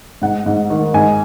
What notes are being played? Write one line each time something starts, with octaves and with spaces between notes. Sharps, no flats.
G#2 F#5
G#2
D#3
G#2 G#5